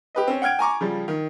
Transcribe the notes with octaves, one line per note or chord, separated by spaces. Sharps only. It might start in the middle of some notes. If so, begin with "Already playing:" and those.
G4 B4 D#5
C4 C#4
F#5 G5 F6 G#6 D7
G#5 A#5 C#6 D6
C#3 F3 G3
D#3